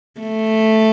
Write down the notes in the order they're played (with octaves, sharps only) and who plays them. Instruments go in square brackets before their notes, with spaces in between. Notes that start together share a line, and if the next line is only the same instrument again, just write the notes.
[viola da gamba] A3